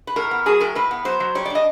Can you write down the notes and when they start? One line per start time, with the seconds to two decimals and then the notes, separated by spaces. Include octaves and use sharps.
0.07 B4
0.16 A2 A#4
0.31 B3
0.46 F#3 G#4
0.60 A2 A#4
0.75 A2 B4
0.91 B3
1.05 F#3 C5
1.20 F#3
1.35 G3 C#5
1.45 D5
1.50 D4 D#5